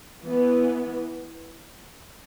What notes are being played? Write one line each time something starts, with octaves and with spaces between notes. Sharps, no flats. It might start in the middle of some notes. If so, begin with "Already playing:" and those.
E3 B3